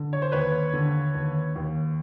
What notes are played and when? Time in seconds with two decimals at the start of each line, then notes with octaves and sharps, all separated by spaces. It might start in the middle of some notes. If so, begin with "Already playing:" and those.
Already playing: D3
0.13 C#5
0.22 C5
0.32 D#2 B4 C#5
0.73 D3
1.15 D#2
1.56 D#2